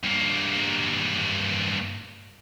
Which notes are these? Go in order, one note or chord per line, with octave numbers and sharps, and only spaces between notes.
G2 A#3